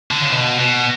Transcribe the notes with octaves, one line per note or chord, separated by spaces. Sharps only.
D3
C#3
B2
B2